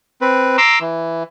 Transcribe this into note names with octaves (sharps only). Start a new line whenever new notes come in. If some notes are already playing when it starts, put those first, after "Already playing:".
C4 B4
A#5 C6 D6 E6
E3